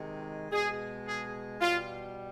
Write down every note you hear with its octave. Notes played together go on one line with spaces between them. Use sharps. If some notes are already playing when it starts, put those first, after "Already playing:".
Already playing: C3 D#3 G#3
B2 G#3 G#4
G#4
B2 G3 F4